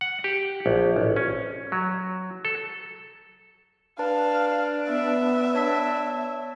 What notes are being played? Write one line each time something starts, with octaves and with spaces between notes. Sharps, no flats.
F#5
G4
A#1
A1
C#4
F#3
A4
D4 B4 F5 A5
B3 E5
D4 C#5 A5 B6